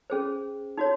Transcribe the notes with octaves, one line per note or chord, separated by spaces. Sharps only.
C#4 G#4 C5
D#4 F#4 C#5